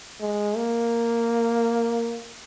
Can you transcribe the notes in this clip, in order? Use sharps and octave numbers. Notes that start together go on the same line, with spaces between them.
G#3
A#3